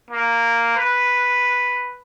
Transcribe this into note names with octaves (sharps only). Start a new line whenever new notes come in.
A#3
B4